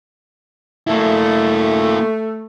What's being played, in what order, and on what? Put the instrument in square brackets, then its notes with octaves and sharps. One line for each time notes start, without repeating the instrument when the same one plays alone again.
[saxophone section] A3 [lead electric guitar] A#3 E4